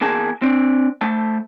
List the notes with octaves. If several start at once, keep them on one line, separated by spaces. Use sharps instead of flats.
E2 A#3 G#4 A5
C4 D4
A3 C5 A5